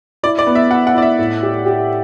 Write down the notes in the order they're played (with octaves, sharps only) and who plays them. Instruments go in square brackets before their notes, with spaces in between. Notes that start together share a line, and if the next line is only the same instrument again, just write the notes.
[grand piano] E4 [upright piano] D5
[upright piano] D5
[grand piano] B3
[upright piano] E5
[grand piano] E4 [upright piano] F#5
[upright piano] F#5
[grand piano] E4 [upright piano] D5
[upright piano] E5
[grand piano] A2
G4
G4